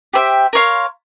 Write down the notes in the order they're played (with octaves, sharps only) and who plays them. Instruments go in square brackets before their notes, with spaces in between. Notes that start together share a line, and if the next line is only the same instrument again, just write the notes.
[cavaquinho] G4 C5 E5 G5
A#4 C#5 F5 C6